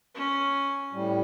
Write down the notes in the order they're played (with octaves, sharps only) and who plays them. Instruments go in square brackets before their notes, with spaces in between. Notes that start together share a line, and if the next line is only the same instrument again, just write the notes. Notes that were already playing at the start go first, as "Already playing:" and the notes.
[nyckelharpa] C#4
[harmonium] A2 G3